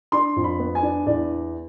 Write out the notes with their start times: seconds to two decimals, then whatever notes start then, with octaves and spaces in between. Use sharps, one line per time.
0.12 D4 C6
0.36 F2
0.44 B5
0.59 B3
0.75 G#5
0.83 D4
1.06 E2 D5